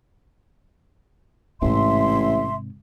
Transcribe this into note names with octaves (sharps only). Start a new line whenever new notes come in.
A1 G#2 C3 E5 C6